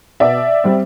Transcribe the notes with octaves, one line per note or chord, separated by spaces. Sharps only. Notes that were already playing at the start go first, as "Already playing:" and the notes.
B2 D5 E5
G3 C4